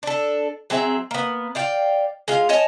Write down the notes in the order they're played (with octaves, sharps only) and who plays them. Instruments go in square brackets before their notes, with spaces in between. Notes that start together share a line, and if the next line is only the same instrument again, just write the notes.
[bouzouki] D4 A4
F#3 C4 G#4 E5
A#3 B3
D5 F5 G5
G#3 F4 F5
C#5 D#5 G#5 A5